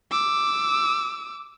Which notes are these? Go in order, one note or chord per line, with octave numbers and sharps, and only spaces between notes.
D6 E6